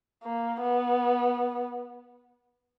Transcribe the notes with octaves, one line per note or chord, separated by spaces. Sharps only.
A#3
B3